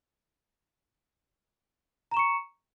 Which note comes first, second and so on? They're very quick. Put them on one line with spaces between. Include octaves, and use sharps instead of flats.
A#5 E7 C#6 C#7